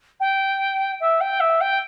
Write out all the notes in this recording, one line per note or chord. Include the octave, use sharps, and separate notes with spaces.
G5
E5
G5
E5
G5